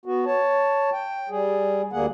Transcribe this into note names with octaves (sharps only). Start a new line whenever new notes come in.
B3 F#4
C#5 A5
G5
G3 G#4
D2 D3 G3 A#3 G#4 F#5